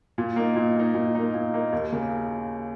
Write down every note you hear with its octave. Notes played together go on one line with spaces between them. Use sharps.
A#2
A#3 D#4
A#2
A#3 D#4
A#2
A#3 D#4
A#2
A#3 D#4
D#2
C#3 A#3